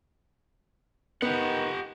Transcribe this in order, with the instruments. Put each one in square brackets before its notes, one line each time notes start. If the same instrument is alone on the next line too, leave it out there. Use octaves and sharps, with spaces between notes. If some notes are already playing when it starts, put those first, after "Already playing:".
[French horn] D#3 [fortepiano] B3 [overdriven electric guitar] G4 F#5